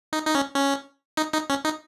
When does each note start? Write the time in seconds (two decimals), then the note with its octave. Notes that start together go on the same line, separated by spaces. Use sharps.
0.13 D#4
0.27 D#4
0.35 C#4
0.55 C#4
1.17 D#4
1.33 D#4
1.50 C#4
1.65 D#4